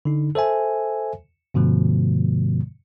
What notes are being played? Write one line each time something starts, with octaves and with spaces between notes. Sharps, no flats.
D3 D#4
A4 C5 E5 G#5
G2 B2 D3 F3 A3